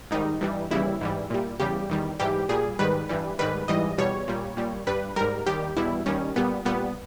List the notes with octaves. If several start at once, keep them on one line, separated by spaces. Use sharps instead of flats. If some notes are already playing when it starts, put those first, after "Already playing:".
G#2 D#3 G3 D#4
G2 E3 G3
D#2 C#3 E3 G3 E4
G#2 E3 G3
A#2 G3
E2 C#3 G3 G4
E2 D#3 G3
G#2 E3 G3 G4
A#2 G3 G#4
G#2 D#3 G3 B4
G2 E3 G3
G#2 D#3 G3 B4
G#2 E3 G3 D#5
E2 B2 G3 C#5
A#2 G3
A#2 G3
G2 G3 B4
G#2 G3 A#4
D#2 D#3 G3 G4
E2 B2 G3 E4
D#2 D#3 G3 C#4
A#2 G3 B3
A#2 G3 B3